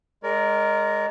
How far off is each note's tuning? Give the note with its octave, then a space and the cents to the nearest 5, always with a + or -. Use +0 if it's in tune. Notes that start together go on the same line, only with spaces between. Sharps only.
G#3 +0 A#4 +0 D5 -45